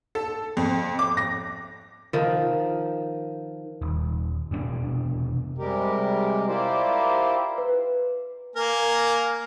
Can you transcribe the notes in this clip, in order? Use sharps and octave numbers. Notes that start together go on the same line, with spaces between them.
A4
F2
D6
A#6
D#3 F3
D#1
F1 B2 C4 D4
C3 G3 G#3 G4 A#4
E4 F4 G4 A#4 C5 D5
B4
A#3 A#4 G#5